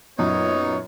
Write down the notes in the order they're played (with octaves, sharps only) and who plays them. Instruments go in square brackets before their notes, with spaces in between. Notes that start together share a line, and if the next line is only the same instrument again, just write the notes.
[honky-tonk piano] F#2 A#2 [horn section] B3 D#4 C#5